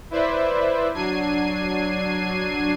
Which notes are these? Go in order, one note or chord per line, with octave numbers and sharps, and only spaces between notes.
E4 B4 C5 D5 E5
F#3 D4 G#6 C7 D#7